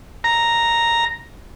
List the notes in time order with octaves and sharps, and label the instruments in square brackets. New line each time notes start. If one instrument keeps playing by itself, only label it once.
[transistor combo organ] A#5